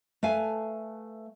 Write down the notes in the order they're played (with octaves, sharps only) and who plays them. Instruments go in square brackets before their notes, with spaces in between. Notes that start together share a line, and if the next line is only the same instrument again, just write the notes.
[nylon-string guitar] A3 B4 F5 G#5